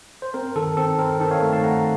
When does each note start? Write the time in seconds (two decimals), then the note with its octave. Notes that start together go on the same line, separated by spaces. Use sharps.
0.22 C5
0.34 C4 A#4
0.56 D#3 A4
0.77 C4 A4
0.99 C4 A#4
1.20 D#3 A4
1.31 C#5 F5
1.42 A3
1.53 F5 A5
1.64 A3 F#5 A#5